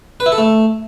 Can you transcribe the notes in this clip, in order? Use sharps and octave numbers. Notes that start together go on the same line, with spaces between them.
B4
E4
A4
A3